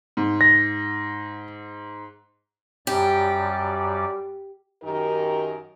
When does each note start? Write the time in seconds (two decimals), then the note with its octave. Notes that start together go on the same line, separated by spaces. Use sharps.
0.17 G#2
0.41 A#6
2.87 F#2 G3 G4 D5
4.82 F#2 D#3 D#4 G4 A#4